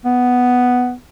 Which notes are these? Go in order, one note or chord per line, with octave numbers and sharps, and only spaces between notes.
B3